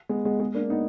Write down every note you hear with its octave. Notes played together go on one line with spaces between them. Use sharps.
G#3 B3
G#3 B3
G#3 B3
A#3 D4
B3 D#4